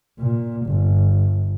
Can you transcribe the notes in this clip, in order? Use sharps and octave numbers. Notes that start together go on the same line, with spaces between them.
A#2
G1